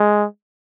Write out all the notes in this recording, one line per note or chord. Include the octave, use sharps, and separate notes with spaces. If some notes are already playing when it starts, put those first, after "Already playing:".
Already playing: G#3